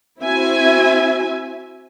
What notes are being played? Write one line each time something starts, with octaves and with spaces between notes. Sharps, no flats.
C4 E4 F#4 E5 G#5